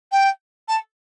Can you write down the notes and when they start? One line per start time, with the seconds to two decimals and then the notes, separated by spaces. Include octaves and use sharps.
0.12 G5
0.68 A5